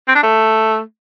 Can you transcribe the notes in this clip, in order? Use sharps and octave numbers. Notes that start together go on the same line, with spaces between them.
C4
D4
A3